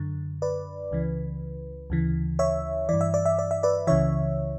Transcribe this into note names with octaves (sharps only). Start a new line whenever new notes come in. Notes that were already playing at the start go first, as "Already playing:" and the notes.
Already playing: F#2 D3
B4 D5
C#2 C#3 E3
D2 C#3 E3
C#5 E5
G2 E3 D5
E5
D5
E5
D5
E5
B4 D5
C#2 C#3 E3 C#5 E5